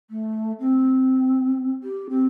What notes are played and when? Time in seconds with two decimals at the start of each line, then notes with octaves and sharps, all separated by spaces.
0.10 A3
0.60 C4
1.83 G4
2.09 C4